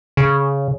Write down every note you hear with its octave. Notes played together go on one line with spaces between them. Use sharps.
C#3